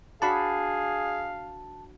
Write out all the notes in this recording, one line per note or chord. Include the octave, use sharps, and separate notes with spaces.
D4 F#4 G#4 F5 A5 B5